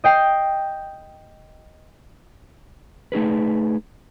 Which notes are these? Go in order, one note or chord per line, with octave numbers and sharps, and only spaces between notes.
D#5 G5 C7
A3 D#4 G#4 B4